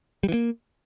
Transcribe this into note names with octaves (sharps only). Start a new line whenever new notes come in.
G3
E3
A#3